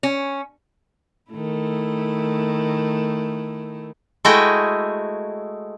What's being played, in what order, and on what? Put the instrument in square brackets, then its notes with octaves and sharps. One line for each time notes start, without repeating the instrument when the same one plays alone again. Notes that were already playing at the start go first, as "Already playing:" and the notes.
[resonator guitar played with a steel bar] C#4
[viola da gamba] D#3 A3 E4
[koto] G#3 A3 E4 F#4 D#5 G5